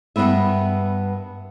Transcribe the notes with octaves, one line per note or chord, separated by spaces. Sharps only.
G2 D#3 B3 B4 E5